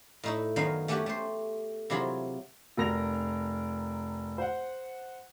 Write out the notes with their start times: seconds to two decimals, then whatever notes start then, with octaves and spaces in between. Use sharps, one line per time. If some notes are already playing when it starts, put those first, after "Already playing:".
0.23 A2 D#4 E4
0.56 F#2 D#3 F#3 B3 F5
0.88 A3 C#4 F#4 G4 C#5 F#5
1.06 A3 C5
1.90 C3 F#3 E4 F4 G#4
2.77 F1 A#4 A#6 F7
4.38 C5 F#5